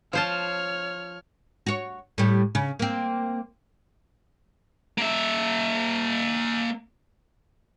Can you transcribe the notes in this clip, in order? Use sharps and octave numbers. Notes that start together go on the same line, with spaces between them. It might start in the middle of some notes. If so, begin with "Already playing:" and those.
F3 C5 C#5 A5 F6
F#4 C#5
A2 G3
C#3
A#3 C4
A#3 E5